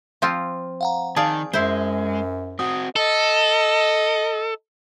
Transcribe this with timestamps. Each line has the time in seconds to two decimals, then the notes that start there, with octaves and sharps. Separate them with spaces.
0.22 F3 C4 F4
0.81 F5 F#5 A#5
1.16 D#3 G#4 D5 F5 A5
1.53 F#2 G#3 E4 C5
2.59 C4 F#4 D#6
2.96 A4 D#5